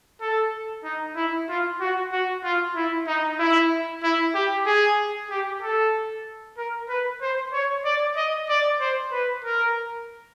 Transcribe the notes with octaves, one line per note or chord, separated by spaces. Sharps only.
A4
D#4
E4
F4
F#4
F#4
F4
E4
D#4
E4
E4
G4
G#4
G4
A4
A#4
B4
C5
C#5
D5
D#5
D5
C5
B4
A#4